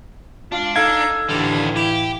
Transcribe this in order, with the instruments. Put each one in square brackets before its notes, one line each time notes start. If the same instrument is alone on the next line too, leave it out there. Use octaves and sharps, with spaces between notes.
[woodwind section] G#3 F4 F5 [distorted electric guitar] D4
[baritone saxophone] D#4 [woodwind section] A4 E6 [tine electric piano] F5 G#6
[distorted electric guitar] D#2 G3 [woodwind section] A2 E3 [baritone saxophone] D3
[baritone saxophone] E4 [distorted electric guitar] G4